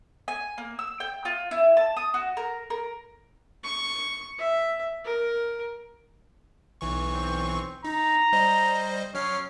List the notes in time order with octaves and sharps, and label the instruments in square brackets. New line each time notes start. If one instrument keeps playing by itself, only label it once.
[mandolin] G#5
A#3
E6
G5
F4
E4
A5
D#6
F#4
A#4
A#4
[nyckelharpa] C#6
E5
A#4
[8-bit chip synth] B1 E3 C#6
[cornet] C4
[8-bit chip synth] D#4 [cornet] A#5
[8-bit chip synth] G3 C5 D#5
[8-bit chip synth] F#3 F6 C7 [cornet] C#4